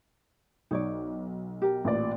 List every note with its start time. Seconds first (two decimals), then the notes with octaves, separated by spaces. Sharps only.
0.71 B1 D#4 C#5 D5
1.62 G4 A#4
1.84 A1 A#2 D5